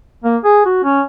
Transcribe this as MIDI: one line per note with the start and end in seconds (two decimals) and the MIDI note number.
0.24 0.37 58
0.44 0.64 68
0.65 0.82 66
0.84 1.02 61